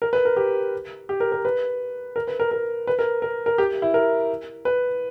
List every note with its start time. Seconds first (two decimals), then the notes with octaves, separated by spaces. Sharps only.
0.02 A#4
0.13 B4
0.25 A#4
0.37 G4
1.09 G4
1.20 A#4
1.32 A#4
1.45 B4
2.16 A#4
2.28 B4
2.40 A#4
2.51 A#4
2.87 B4
2.99 A#4
3.22 A#4
3.46 A#4
3.58 G4
3.82 E4
3.94 A#4
4.65 B4